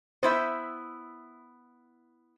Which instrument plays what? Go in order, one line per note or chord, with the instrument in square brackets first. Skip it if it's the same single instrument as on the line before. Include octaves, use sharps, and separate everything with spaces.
[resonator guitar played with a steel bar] B3 E4 E5 [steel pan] C5